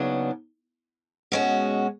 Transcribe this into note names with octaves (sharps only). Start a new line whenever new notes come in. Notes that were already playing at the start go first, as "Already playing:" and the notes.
Already playing: D#2 C#3 F#3 B3 D4
B2 G#3 C#4 F#4